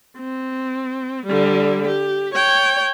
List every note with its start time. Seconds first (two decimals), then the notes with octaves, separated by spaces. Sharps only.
0.18 C4
1.27 D3 G3
1.87 G4
2.34 C#5 G5